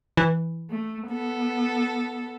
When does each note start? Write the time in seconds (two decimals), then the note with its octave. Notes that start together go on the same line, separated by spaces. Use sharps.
0.17 E3 E4
0.71 A3
1.09 B3 A4